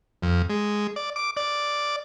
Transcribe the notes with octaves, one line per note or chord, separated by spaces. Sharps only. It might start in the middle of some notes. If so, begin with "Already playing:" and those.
F2
G#3
D5
D6
D5